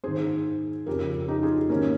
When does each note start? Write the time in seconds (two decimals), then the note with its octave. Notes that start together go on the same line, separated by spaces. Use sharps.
0.04 G#2 D#3 G#4 C5
0.86 F2 C#3 G4 A#4
1.28 D#4 G4
1.43 F4 G#4
1.69 G#2 D#3 A#3 C#4